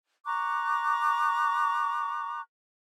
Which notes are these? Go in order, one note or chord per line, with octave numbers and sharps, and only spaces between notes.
A#5 C#6 D6 F#6